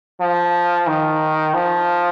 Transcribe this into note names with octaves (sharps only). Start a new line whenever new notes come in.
F3
D#3
F3